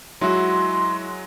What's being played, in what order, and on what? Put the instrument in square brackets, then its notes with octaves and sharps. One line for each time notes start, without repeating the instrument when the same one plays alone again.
[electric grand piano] F#3 G#3 [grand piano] E4 F#4 [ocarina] C6